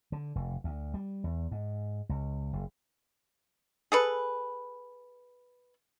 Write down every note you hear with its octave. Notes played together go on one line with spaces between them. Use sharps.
D3
F1
D2
G3
E2
G#2
C#2
F#1
G#4 A4 B4